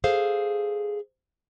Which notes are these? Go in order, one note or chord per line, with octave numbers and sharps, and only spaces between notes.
G#4 A4 C5 F5